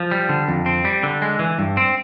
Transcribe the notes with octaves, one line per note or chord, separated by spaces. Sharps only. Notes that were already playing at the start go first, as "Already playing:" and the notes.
Already playing: F3
G3
D3
F2
C4
G3
D3
G#3
E3
G2
C4